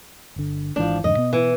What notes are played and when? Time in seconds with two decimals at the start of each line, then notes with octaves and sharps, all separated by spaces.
0.36 G1 D3
0.76 G#1 G#2 E3 F3 D4
1.04 F2 G#2 D3 D#5
1.16 B2 B3
1.33 E3